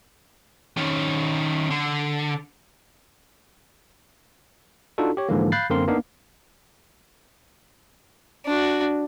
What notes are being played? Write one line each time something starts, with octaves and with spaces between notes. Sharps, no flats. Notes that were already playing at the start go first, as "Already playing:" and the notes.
D#3 C#4
D3
D4 D#4 F4 F#4 A4
G4 C#5
G#2 D3 E3 F3 G#3 A#3
F5 B5 F#6 G6 A6 C7
F#2 D3 A#3 C4 A#4 C6
A#3 B3 D4 D#4 F5
D4 F#4